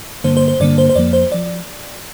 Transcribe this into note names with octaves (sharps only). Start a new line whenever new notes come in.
G2 D3 A#3 C5
C5
C5
G2 D3 A#3 D5
C5
C5
F2 F3 A#3 D5
C5
F3 D5